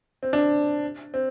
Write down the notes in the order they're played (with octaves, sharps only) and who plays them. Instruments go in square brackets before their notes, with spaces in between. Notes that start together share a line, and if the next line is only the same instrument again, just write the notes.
[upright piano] C4
D4
C4